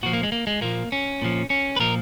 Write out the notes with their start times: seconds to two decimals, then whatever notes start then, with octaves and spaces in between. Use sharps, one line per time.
0.03 A#2 F3 F#4
0.13 A#3
0.23 G#3
0.32 A#3
0.47 G#3
0.61 A#2 F3 A#3
0.92 C#4
1.22 A#2 F3
1.50 C#4
1.76 B4
1.80 A#2 F3 A#4